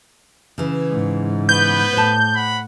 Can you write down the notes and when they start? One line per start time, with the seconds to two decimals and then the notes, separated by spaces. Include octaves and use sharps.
0.58 C#3 E3
0.90 G#2
1.49 B3 B4 G6
1.93 A2 C5 A5
2.35 F#5 B5